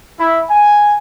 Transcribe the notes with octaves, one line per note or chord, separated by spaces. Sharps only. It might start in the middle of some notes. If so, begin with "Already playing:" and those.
E4
G#5